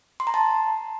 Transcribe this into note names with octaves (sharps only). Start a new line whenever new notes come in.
C6
A#5
A5